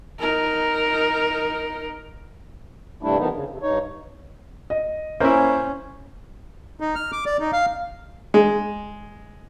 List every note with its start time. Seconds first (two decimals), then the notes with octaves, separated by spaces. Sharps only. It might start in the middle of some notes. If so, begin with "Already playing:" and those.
0.20 D#4 A#4
3.03 G2 C3 G3 A3 D4 E4
3.18 D3 D#3 F3 B3 D4 D#4
3.33 C#3
3.50 F2 C3
3.62 G2 D#4 C#5
4.70 D#5
5.20 A#3 C#4 E4 C5
6.80 D#4
6.95 F6
7.12 D6
7.26 D5
7.40 D#4
7.53 F5
8.34 G#3